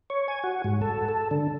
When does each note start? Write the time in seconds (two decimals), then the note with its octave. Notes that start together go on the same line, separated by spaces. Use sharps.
0.10 C#5
0.28 G#5
0.44 F#4
0.64 G#2
0.82 A4
1.09 A4
1.31 D3